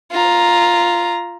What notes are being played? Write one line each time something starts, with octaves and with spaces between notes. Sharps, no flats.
F4 A#5